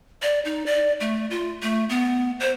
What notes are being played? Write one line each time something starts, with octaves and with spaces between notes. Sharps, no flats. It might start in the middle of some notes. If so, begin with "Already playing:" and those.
D5
D#4
D5
A3
F4
A3
B3
C5